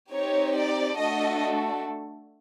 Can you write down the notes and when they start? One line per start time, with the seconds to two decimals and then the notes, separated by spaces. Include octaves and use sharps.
0.12 C4 D#4 G4 C#5
0.54 D5
0.97 A3 D4 F#4 A4 D#5